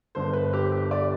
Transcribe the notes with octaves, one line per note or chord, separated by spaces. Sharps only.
G1 G2 D3 C5
B4
G4
G4
D5